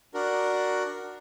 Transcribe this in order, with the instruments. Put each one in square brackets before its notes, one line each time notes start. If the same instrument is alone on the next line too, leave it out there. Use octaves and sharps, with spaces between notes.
[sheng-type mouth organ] D4 F#4 A#4